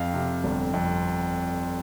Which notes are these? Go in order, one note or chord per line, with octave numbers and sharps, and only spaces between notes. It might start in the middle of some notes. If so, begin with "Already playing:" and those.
Already playing: F2 F5
C3
G1
F2